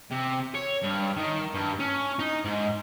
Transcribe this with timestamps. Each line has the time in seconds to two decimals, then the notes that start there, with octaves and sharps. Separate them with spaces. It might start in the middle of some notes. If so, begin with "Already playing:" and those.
0.11 C3
0.55 C#5
0.83 G2
1.16 D#3
1.54 G2
1.80 C#4
2.19 D#4
2.44 G#2